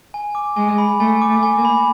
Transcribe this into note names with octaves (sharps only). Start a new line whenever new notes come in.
G#5
D6
G#3 G#5
B5
A3 G#5
D6
A3
G#5
A#3
B5